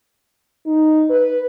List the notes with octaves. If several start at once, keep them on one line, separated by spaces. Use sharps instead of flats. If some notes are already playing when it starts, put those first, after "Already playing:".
D#4
B4